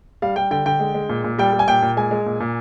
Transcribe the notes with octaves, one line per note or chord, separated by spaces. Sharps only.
G3 F5
G3 G5
D3 G5
D3 G5
G#3
G#3
A#2
A#2
G3 G5
G3
G#5
A#2 G5
A#2
G#3 G#5
G#3
A#2
A#2